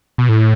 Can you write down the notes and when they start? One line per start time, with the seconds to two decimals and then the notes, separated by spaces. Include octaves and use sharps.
0.18 B2
0.29 A2